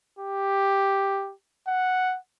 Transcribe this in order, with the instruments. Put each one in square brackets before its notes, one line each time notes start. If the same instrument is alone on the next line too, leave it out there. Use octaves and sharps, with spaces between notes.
[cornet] G4
F#5